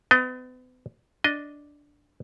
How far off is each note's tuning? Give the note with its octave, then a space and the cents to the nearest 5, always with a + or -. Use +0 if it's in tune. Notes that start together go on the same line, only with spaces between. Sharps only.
B3 +40 D#5 +0
D4 -5 D#5 +0